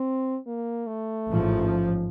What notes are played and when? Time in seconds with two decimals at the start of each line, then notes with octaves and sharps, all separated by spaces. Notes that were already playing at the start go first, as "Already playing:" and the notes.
Already playing: C4
0.47 A#3
0.87 A3
1.28 A1 G#2 F3